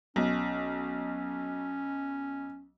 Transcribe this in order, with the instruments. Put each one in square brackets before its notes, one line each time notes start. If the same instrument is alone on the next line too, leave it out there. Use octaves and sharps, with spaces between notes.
[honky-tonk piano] B1 [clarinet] C#4